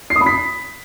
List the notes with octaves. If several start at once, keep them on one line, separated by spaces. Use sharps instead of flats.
C7
D#6
B5
B6